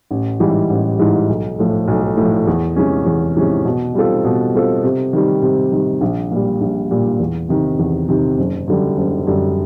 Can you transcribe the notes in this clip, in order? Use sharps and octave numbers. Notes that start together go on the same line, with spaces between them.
A1
G#2 E3 G3
A1
G#2 E3 G3
B1
A2 F3
B1
A2 F3
E2
C3 E3 G#3 C#4
E2
C3 E3 G#3 C#4
B2
G3 C4 F4 A4
B2
G3 C4 F4 A4
C3
D#3 G3
C3
D#3 G3
A#1
A#2 G3
A#1
A#2 G3
E2
C3 D#3
E2
C3 D#3
F#1
F#2 D3 G3
F#1
F#2 D3 G3